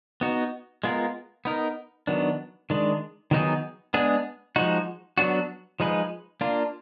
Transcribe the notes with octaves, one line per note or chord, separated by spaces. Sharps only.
B3 D#4 F#4
G#3 B3 F4 A#4
B3 D#4 A#4
D#3 F#3 B3 D4
D#3 G#3 D4
D#3 F#3 B3 D#4 G#4
G#3 B3 D4 G#4
F3 G#3 D#4 F#4
F#3 B3 D4 F#4
F3 G#3 D#4 G#4 B4
A#3 D4 F4